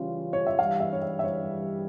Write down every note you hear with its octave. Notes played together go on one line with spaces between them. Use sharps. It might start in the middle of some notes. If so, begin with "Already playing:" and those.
Already playing: C#3 E3 G3 C#4 F4
C#5
E5
G2 E3 G3 F5
E5
C#5
E5
E5
C#5